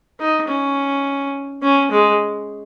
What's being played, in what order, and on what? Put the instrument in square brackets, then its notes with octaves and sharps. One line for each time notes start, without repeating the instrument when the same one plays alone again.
[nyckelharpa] D#4
C#4
C#4
G#3